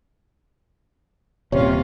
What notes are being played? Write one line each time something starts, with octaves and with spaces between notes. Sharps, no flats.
D#1 C3 A#3 C#4 F4 C#5